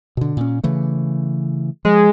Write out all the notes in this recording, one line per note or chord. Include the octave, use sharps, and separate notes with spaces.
B2 D3
A#2 C#4
C#3 E3 A3
F3 G#3